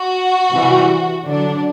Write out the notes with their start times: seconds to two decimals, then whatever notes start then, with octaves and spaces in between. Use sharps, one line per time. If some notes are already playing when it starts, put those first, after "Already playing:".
Already playing: F#4
0.53 C3 E3 G3
1.26 D3 F#3 D4